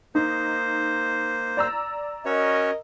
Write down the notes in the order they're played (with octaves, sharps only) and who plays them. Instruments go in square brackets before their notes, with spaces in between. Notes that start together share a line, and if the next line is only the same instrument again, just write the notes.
[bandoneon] A#3 C5 [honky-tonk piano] D#4
[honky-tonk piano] D5 A#5 E6
[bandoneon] C#4 F#4 C#5 [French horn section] A#4 D#5